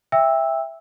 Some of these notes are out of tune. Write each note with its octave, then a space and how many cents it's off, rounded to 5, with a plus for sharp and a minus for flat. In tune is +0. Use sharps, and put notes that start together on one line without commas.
E5 +0 G5 +25 E6 -5